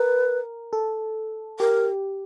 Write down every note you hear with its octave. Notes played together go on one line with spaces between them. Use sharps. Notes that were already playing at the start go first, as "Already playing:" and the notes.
Already playing: A#4 B4
A4
G4 A#4